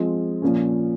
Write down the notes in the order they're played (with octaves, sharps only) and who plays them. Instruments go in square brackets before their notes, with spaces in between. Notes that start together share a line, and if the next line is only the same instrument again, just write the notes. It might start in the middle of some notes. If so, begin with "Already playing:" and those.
Already playing: [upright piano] F3 G#3 C4
A#2 F3 A#3 C#4